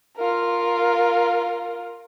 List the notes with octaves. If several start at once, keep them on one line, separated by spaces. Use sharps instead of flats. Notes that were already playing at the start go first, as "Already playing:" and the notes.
F4 A#4